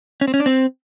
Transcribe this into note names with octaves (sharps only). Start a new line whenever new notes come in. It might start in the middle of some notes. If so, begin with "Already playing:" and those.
C#4
C4
C#4
D4
C4